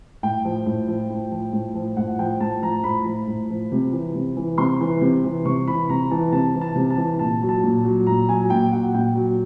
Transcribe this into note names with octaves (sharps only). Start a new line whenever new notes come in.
A2 G5
F3
A2
F3
A2
F3
A2
F3
A2 F#5
F3 G5
A2 A5
F3 A#5
A2 B5
F3
A2
F3
C3
E3
C3
E3
C3 C6
E3
C3
E3
C3 C#6
E3 B5
C3 A#5
E3 A5
C3 A5
E3
A5
C3
A5
E3
A#2 A5
F#3
A5
A#2
F#3
A#2 A#5
F#3 G#5
A#2 G5
F#3 F#5
A#2 G5
F#3